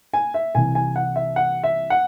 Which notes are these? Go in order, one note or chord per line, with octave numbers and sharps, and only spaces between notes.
G#5
E5
C2 C3 E3 G#5
G#5
F#5
E5
F#5
E5
F#5